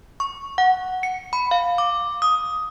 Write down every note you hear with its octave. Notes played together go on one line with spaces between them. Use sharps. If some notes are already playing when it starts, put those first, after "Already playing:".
C#6
F#5
C#7
B5
F5
D6
D#6